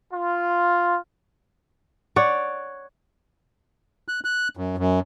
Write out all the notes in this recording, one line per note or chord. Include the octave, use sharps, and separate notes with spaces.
F4
C#5 D5 F#5
F#6
F#6
F#2
F#2